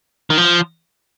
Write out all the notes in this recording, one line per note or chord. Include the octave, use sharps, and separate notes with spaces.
D#3
F3